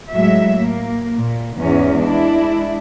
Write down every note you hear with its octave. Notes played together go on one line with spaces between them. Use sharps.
A2 F#3 G#3 E5
A#3
A#2
E2 G#2 C#4
G#3 D4 E4